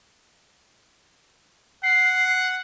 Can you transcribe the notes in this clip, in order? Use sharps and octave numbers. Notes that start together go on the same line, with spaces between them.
F#5 C7